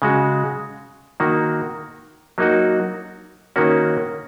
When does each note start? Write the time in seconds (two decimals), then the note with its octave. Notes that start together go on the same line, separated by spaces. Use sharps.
0.02 C#3 G#3 F#4
1.20 D#3 A#3 F#4
2.38 F#3 A#3 D#4 F#4
3.56 D#3 A#3 C#4 F#4